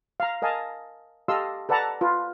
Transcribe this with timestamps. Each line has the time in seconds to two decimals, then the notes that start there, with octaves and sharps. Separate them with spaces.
0.20 F5 A#5
0.42 A#4 D#5 F5 G#5 A5
1.28 G4 A4 D#5 F5 C6 E6
1.69 A4 B4 D5 F#5 A5 A#5
2.01 F4 B4